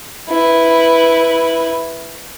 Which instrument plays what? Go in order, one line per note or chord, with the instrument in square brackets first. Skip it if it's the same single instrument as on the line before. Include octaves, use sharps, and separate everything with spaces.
[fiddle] E4 B4